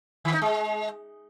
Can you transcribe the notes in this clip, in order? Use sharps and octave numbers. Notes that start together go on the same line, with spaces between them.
D#3
D#4
G#3